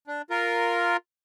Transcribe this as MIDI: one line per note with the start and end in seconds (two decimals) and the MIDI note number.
0.07 0.22 62
0.30 0.97 65
0.30 0.97 70